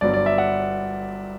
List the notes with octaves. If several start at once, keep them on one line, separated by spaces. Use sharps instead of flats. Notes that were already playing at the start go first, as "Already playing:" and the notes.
G1 G2 F#3 B3 D5
D5
E5
F#5